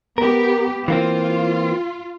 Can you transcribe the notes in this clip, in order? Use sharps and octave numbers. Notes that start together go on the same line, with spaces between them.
B3 G4 A#4
E3 A#3 C4 F4